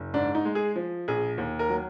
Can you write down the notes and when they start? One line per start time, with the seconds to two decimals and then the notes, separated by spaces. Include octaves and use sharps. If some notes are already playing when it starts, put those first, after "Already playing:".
Already playing: F#1
0.14 G#2 D4
0.35 D#4
0.45 G#3
0.55 G#4
0.76 F3
1.08 A#1 G#4
1.38 D#2
1.59 A#4
1.70 F#3